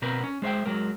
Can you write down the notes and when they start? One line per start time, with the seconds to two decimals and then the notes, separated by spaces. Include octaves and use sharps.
0.02 B2 C4 A#4 B4
0.24 C#4
0.42 G#3 C5 E5 G5
0.66 F#3 G#3 A#4